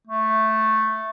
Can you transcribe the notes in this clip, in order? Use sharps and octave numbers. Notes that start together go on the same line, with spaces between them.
A3